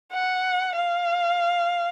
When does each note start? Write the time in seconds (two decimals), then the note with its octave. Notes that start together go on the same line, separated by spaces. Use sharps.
0.12 F#5
0.76 F5